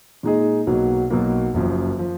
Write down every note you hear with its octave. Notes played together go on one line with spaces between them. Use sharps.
A#2 G#3 D#4 G#4 D#5
B1 B2 F#3 A#3
B1 B2 F#3 A#3
F#1 F#2 F3
F3